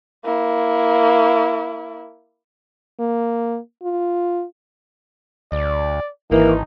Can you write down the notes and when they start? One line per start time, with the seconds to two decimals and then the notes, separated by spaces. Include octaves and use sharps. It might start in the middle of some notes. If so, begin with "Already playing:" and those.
0.24 A#3 E4
3.00 A#3
3.83 F4
5.52 D2 D5
6.31 G#1 E3 A#3 D#4